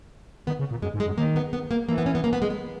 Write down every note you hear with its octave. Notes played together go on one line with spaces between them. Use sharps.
D#3 B3
C#3
A#2
F#2 G#3
G#2
G#3
F#2
D#3 A#3
B3
B3
A#3
E3 A#3
B3
C#4
B3
A#3
B3
G#3
B3